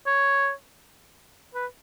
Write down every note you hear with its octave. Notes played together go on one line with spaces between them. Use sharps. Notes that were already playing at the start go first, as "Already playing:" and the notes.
C#5
B4